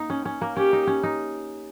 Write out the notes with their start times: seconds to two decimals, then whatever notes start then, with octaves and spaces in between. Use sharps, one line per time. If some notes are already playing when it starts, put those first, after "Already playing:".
Already playing: A#3 D#4
0.10 C#4
0.25 C#4
0.41 A#3
0.56 C#4 G4
0.73 D#4
0.87 C#4
1.03 D#4